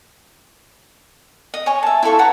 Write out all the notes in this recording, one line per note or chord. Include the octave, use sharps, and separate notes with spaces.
D#5
C#5 G#5 C#6
E5 A5
E4 F4 A4 C#6
B4 F#5 A5 A#5